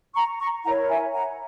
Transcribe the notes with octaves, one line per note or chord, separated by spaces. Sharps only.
A#5 C#6
A#5 C#6
E4 A#4 C#5 F#5 A#5
E5 G#5
F#5 A#5